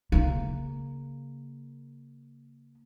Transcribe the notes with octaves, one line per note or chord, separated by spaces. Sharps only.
C#3 A#3